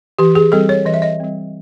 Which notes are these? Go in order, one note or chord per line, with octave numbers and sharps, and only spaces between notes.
E3 G4
G#4
G3 C4 A4
C#5
E3 D#5
E5
D#5
G3 C4